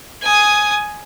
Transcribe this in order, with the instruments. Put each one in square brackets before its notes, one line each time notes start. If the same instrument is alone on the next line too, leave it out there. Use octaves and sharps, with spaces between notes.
[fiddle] G#5 D#6